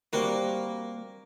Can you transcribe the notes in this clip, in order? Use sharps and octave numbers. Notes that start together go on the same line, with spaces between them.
G3 A#3 C4 F#4